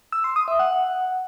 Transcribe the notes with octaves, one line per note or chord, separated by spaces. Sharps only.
E6
C6
D#6
E5
F#5